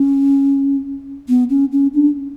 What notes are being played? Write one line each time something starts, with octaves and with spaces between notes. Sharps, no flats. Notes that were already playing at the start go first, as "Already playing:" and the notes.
Already playing: C#4
B3
C#4
C#4
D4